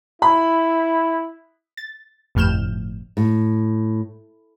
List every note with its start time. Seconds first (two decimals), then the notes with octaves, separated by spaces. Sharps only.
0.22 E4 B5
1.77 A6
2.35 G1 F2 A2 F6 G6 E7
3.17 A2